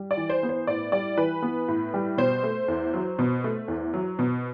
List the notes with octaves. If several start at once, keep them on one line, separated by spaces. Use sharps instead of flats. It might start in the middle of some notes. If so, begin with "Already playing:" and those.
Already playing: G3
D5
E3
C5
B3
C5
A2 D5
G3 D5
E3 B4
B3
A2
G3
B2 C5
A3
E2
F#3
B2
A3
E2
F#3
B2